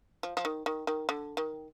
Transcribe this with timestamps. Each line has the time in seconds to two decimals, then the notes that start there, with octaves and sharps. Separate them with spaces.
0.23 F3
0.37 F3
0.45 D#3
0.66 D#3
0.87 D#3
1.09 D3
1.37 D#3